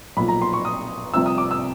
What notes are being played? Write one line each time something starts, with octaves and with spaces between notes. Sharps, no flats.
B1 A#2 F3 B5
A#5
C6
C#6
D#6
C2 C3 F3 E6
D#6
D6
E6